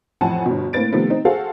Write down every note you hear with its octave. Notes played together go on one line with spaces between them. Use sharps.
A1 F2 F#5 G#5 A5
G1 B2
A2 A#3 C4 B4 A6 D7
C3 D#3 F3 A3 B3
C4 D#4
F#4 G#4 A4 C5 F5 F#5